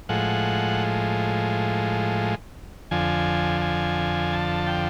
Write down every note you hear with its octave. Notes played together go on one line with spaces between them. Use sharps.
A2 F3 G#3 F#5
F2 D3 F3 G#5
G#5
A5
G5